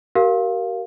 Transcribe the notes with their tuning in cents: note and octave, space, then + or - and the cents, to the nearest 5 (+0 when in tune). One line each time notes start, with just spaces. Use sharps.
G4 -40 A#4 +0 F5 +0